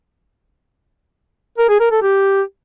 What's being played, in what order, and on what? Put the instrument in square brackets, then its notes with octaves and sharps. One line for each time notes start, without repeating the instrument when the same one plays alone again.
[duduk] A#4
G#4
A#4
A4
G4